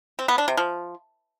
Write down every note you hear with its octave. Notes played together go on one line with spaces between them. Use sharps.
C4
B3
D4
C3
F3